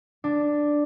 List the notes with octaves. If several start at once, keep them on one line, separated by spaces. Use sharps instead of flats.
D4